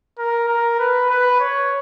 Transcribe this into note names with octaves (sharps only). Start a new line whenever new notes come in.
A#4
A#4
B4
B4
C#5